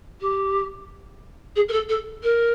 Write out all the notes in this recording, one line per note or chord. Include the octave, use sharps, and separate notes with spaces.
G4
G#4
A#4
A4
A4
A#4